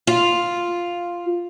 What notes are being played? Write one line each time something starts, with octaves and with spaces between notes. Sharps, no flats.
F4